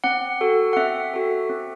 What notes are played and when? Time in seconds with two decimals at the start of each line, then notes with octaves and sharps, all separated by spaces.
0.04 C4 F#5
0.41 F#4 A4
0.73 F#5
0.76 C4 E5
1.14 F#4 A4
1.49 C4